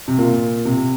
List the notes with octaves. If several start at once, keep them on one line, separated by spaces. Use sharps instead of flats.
C3
A#2
C3